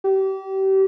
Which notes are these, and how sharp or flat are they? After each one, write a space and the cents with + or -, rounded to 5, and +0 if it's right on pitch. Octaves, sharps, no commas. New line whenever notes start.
G4 -30